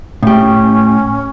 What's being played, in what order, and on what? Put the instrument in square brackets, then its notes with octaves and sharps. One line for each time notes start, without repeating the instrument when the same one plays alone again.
[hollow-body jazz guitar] A2 G4 [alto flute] C#4